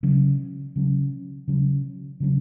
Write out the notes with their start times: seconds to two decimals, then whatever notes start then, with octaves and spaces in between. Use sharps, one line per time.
0.03 C#3 F#3 C#4
0.76 C#3 F#3 C#4
1.48 C#3 F#3 C#4
2.20 C#3 F#3 C#4